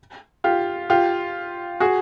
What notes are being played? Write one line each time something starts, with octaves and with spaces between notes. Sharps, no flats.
F4 G4
F4 G4
F#4 G#4